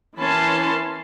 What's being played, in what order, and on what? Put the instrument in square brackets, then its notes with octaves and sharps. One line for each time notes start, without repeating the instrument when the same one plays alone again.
[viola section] E3 C#4 A#4 A5 B5 C6